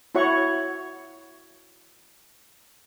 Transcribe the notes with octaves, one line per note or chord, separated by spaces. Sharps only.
E4 F#4 C#5 F#5 C#6